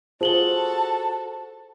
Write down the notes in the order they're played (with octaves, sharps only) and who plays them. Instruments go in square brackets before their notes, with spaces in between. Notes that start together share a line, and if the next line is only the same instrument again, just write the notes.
[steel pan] F4 G#4 [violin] F#4 A4 [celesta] C5 F#7 G7 [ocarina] A5